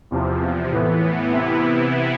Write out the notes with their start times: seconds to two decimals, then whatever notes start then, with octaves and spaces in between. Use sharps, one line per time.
0.11 E2 C3 F3
0.71 A2 E3 B3
1.32 C3 E3 B3 E4